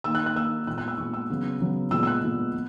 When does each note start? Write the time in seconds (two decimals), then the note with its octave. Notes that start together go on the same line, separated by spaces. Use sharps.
0.04 D#3 A#3 E6
0.15 F#6
0.26 F#6
0.36 D#3 A#3 E6
0.67 A#2 G#3 B3 F#6
0.78 F#6
0.88 E6
0.98 A#2 G#3 B3 C#6
1.14 E6
1.30 C#3 F#3 B3
1.60 C#3 F#3 B3
1.91 A#2 G#3 B3 E6
2.03 E6
2.07 F#6
2.23 A#2 G#3 B3
2.53 B3